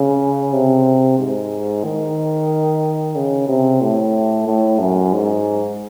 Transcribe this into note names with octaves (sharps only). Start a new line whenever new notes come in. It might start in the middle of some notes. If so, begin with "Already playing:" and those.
Already playing: C#3
C3
G#2
D#3
C#3
C3
A2
A2
F#2
G#2